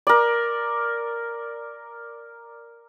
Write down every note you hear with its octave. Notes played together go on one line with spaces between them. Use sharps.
A#4 D5